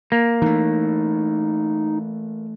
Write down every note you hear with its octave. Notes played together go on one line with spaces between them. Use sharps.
A#3
E3 A3 D#4